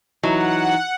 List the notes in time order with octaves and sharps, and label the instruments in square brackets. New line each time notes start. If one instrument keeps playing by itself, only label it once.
[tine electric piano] E3 D#4 E4 [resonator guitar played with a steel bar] F#3 [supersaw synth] F#5